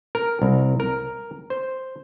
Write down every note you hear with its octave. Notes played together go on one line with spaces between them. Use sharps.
A#4
C2
A#4
C5